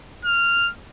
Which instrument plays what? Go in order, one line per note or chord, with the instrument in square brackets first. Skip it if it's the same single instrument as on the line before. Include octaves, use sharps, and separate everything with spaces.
[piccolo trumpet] F6